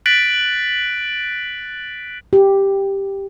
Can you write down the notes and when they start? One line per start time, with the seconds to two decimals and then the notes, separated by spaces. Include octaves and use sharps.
0.06 F#6 A6 B6 D7 F#7
2.33 G4